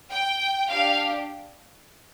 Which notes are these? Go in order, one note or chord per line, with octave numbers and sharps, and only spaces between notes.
G5
D4 G4 F5